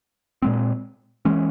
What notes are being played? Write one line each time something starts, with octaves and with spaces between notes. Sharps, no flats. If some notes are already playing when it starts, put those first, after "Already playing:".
A#2 G#3 C4
E3 G#3 C#4